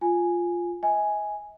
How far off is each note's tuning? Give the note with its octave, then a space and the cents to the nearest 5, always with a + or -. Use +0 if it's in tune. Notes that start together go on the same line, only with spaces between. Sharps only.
F4 +0 G#5 +0
D#5 +45 G#5 +0